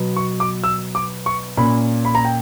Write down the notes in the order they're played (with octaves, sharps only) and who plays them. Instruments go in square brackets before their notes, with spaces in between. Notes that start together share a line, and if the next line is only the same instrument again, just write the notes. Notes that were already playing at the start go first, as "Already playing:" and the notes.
Already playing: [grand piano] B2 F#3 B3
C#6
D6
E6
D6
C#6
A#2 A#3 C#4 B5
B5
A#5
G5